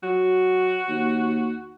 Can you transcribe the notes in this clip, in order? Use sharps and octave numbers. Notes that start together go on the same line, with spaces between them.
F#3 F#4
D#2